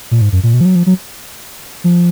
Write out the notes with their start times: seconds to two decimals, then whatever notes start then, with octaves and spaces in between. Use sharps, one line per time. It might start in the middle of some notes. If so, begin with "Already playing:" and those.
0.11 A#2
0.21 G#2
0.32 F#2
0.43 A#2
0.54 B2
0.61 F3
0.65 F#3
0.75 F3
0.86 F#3
1.84 F3